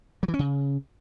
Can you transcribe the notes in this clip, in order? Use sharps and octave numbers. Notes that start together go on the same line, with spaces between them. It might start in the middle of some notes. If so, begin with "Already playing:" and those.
F#3
E3
C#4
C#3